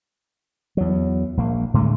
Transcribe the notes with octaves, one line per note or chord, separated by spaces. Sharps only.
E2 F#3
A#1 A#3
A2 D3 G#3 A3